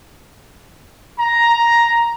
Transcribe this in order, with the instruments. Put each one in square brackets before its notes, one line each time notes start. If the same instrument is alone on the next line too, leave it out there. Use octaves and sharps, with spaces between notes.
[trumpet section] A#5